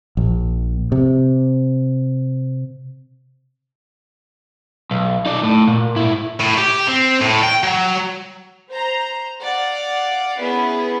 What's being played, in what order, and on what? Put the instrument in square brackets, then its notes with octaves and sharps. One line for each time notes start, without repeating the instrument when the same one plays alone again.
[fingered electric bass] A#1
C3
[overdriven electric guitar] B1
D#4 D5
A2
A#2
G#2 E4
[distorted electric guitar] A2
G4
C4
A2
G5
F#3
[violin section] C5 A#5
D5 F5 F#5
B3 C#4 E4 G#4 B4